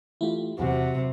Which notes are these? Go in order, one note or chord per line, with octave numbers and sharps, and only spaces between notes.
E3 A3 E4 F4 G4
E2 C3 F#3 F#4 G4